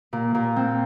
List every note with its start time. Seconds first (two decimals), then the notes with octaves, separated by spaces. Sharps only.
0.13 A#2
0.35 A#2
0.56 C4